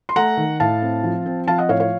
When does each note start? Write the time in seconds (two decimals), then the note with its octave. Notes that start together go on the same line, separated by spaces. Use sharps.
0.09 C6
0.16 A3 F#5 A#5
0.37 D#3
0.60 A2 F5 A5
0.82 C4
1.04 F3
1.26 C4
1.47 F3 F5 A5
1.58 D#5 F#5
1.69 A2 C#5 F5
1.80 C#5 F5